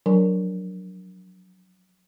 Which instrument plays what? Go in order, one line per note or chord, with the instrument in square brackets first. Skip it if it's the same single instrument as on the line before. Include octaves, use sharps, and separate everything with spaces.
[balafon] F3 F#3 D4 A#4 G#5